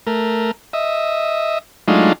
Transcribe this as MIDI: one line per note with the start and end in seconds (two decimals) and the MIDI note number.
0.07 0.51 57
0.07 0.51 70
0.73 1.59 75
0.73 1.59 76
1.88 2.13 54
1.88 2.13 56
1.88 2.13 57
1.88 2.13 62
1.88 2.13 63
1.88 2.13 65